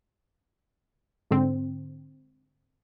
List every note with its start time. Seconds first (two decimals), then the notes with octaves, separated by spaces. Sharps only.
1.31 G#2 D3 C4